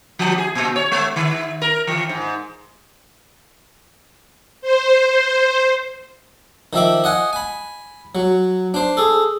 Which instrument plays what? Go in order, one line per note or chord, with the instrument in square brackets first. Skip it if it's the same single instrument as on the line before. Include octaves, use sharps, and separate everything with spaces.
[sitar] F3
G#4
A#2
C#5
G#3
D#3
A#4
E3
G#2
[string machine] C5
[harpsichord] D#3 F3 E5 D6
D#5 F#5 G#5
G#5 B5
F#3
D4 C5
G#4 A4